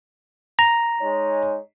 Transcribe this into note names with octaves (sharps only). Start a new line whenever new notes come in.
A#5
G#3 D#4 C#5